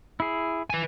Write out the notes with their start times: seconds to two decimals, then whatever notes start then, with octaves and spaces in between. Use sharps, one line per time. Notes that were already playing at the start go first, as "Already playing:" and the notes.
0.20 E4 G#4
0.70 B4 G#5